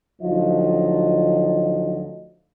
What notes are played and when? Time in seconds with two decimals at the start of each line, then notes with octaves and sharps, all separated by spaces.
0.22 D2 F3 F#3 D#4 D#5